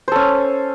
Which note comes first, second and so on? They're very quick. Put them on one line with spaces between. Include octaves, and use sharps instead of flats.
C5 A4 C#4